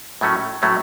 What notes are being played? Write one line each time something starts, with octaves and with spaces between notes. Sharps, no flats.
A2 F#3 A3 C#4
A2 F#3 A3 C#4